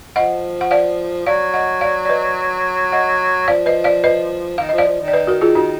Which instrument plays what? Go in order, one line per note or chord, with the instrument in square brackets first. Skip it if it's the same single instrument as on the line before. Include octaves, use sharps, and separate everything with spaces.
[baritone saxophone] F3 [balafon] D#5 F#5
[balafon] F#5
D5 F5
[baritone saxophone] F#3 [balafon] D5 F5
[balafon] D#5 F#5
D5 F5
D5
B4 D#5
D#5 F#5
[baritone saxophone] F3 [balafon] D5 F5
[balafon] B4 D#5
D5 F5
B4 D#5
[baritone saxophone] D#3 [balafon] F5
[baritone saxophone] F3 [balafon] D#5
[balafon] D5 F5
[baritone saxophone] F3
D#3
[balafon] D5
B4 D#5
F#4 A#4
F4 G#4
D#4 F#4